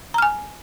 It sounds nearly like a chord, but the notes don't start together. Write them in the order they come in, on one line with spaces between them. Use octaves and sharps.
A#5 F6 G#5